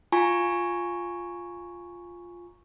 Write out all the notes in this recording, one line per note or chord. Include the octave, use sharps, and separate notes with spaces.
F4 G#5 A#5 C#6